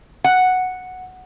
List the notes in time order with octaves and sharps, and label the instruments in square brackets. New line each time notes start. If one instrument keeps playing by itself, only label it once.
[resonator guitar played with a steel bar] F#5